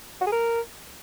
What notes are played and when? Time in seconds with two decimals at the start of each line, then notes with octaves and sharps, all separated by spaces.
0.21 F#4
0.27 G#4
0.32 A#4